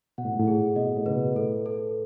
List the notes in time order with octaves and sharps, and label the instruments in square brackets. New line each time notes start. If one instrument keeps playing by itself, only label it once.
[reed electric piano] B2 [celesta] F#5
[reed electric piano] A2
G#2
A2
[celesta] G#4
[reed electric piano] B2 [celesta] D#5
[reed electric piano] A2
[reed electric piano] C#3 [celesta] B4
[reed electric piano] B2
[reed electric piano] A2 [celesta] A4
[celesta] A4